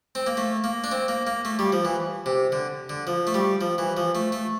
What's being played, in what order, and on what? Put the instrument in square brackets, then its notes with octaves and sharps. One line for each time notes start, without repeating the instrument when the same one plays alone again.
[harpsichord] C4
A#3
A3
A#3
D4
C4
A#3
A#3
A3
G3
F3
E3
C3
D3
D3
F3
A3
G3
F3
E3
F3
A3
A3